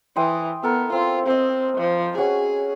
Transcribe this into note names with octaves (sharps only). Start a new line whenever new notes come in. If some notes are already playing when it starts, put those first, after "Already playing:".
E3 G5 C6 D#6
B3 A4 A#4
C4 F4
C4 C5 D#5
F3
C#4 F#4 G#4 C#5